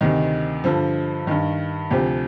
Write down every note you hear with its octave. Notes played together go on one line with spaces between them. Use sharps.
D2 C3 D#3 D#4
G2 D3 F3
G2 D#3
D2 C3 F3 G4